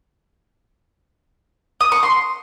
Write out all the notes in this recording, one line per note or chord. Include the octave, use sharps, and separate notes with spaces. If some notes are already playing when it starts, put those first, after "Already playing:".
D#6
C#6
C6